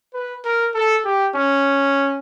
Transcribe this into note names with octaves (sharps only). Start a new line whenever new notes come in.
B4
A#4
A4
G4
C#4